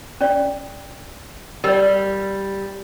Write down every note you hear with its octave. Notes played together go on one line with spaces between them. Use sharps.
C#4 D5
G3 A#4 D5